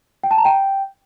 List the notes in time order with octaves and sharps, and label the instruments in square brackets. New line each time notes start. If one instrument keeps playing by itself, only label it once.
[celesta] G5
A5
A#5
G5